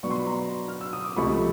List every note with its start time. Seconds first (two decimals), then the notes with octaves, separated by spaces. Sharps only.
0.03 B2 F#3 B3 D4 C#6
0.11 C6
0.19 B5
0.26 A#5 C6
0.68 F6
0.81 E6
0.93 D#6
1.04 D6
1.16 C#2 C3 F3 A3 B5 C#6